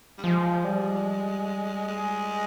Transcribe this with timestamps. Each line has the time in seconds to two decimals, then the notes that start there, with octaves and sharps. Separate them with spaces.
0.18 G3
0.24 F3 G#3
0.64 G3
1.88 G#3